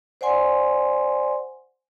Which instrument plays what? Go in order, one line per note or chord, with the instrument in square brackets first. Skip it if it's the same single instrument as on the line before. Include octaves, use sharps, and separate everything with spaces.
[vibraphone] C5 D5 F#5 G#5 C6